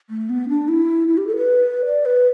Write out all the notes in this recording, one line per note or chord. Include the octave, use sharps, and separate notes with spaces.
A3
B3
D4
E4
E4
G4
A4
B4
D5
B4